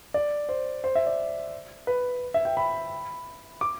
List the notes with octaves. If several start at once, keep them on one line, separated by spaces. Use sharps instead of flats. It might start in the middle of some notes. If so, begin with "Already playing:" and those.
D5
C5
C5
E5
D5
B4
E5
G5
B5
D6